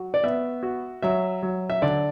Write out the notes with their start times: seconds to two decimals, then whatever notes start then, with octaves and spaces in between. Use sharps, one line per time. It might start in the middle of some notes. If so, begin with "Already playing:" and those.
Already playing: F#3 F#4
0.14 D5
0.23 B3 E5
0.63 F#4
1.02 F#3 E5
1.43 F#3
1.70 E5
1.82 D3 D5